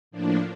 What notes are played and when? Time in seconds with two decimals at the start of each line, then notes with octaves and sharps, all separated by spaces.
0.11 A2 F3 A#3 D4